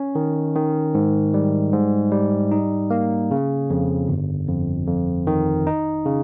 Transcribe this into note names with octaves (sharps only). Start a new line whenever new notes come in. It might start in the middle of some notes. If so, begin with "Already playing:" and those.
Already playing: C#4
D#3
D#3
G#2
G3
G#2
G3
D#4
A#3
C#3
F2
G1
F2
F2
D#3
D#4
C#3